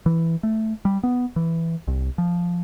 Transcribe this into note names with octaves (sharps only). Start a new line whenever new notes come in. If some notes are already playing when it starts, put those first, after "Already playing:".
E3
A3
G3
B3
E3
C2
F3